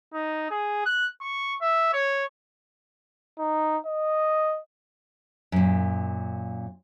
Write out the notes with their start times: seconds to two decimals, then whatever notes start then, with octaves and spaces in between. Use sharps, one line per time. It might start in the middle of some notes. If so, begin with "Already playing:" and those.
0.14 D#4
0.51 G#4
0.85 F#6
1.21 C#6
1.62 E5
1.93 C#5
3.39 D#4
3.86 D#5
5.52 F#2 A#2